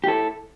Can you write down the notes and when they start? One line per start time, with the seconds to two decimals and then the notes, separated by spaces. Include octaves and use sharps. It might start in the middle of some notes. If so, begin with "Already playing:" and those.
0.04 G4
0.07 E4 A4